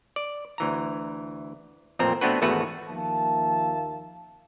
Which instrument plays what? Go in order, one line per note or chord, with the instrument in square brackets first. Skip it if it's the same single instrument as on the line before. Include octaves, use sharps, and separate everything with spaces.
[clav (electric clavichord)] D5
D2 E3 A#5
A1 F2 A#2 C4 A#5
A3 B3 C4 D4 F#4 B4
G#1 E2 A3 F#4 B4
[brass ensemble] D#2 F3 A#3 E5 F5 A5